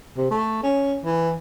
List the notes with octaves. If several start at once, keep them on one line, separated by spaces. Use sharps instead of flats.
C3
A3
C#4
E3